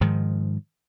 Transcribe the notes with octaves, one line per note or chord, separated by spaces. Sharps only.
G#2 D#3 F3